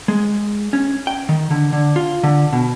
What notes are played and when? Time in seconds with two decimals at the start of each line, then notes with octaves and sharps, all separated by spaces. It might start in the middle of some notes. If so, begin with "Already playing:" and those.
0.08 G#3
0.73 C#4
1.07 G5
1.29 D#3
1.50 D3
1.73 D3
1.96 F4
2.23 D3
2.52 B2